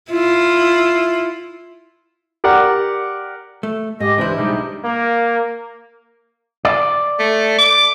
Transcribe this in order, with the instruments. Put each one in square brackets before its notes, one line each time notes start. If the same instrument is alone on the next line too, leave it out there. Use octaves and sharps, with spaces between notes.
[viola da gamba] E4 F4
[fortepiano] G4 A#4 D5 F#5
[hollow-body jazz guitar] A3
[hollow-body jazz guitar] G#2 [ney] G4 [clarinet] D#5
[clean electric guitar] C#2 [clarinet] E3 [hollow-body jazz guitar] D4 E4 [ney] C5
[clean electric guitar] B1 G3 G#3 [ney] D#4 [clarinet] G4
[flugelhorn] A#3
[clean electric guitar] D5
[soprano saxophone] A3
D6